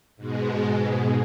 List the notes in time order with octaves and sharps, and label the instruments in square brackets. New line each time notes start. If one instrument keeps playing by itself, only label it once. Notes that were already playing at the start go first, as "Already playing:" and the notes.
[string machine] G#2 B2 G#3